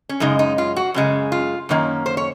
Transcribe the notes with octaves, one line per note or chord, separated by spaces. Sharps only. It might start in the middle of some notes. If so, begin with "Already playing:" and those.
C#4
F#2 C#3 G#3 D#4
D#4
F4
F#4
F#2 C#3 G#3
F4
F#2 D#3 A#3 C#4
C5
C#5